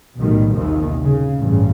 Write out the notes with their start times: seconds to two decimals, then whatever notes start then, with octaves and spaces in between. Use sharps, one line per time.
0.19 B1 A2 D#3 G3
0.55 A#1 D#2 C3 D#3
1.01 C#3
1.37 A1 G2 C#3